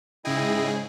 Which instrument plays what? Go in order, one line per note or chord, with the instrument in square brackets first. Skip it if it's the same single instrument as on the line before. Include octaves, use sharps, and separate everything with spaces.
[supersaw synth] G#2 C#3 G#4 [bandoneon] E4 D#5 G5